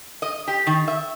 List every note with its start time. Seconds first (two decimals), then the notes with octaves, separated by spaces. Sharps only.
0.22 D#5
0.47 G4
0.67 D#3
0.88 E5